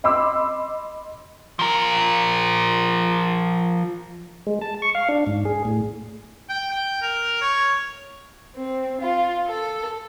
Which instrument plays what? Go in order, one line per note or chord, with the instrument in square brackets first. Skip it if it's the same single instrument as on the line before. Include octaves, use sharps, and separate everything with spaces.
[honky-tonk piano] D#5 B5 C6 D6 E6
[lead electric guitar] F3 A#4
[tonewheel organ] G#3
A5
C#6
F5
D4
G#2
G#4
A2
[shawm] G5
G5
A#4
C#5
[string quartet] C4
F4
A4